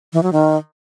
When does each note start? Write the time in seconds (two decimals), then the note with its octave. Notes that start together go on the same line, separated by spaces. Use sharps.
0.13 E3
0.23 F#3
0.33 D#3